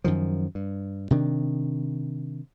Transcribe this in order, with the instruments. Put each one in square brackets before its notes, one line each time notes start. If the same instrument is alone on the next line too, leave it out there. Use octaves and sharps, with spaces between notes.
[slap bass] F#2 D#3 F3
G2
C3 D#3 D4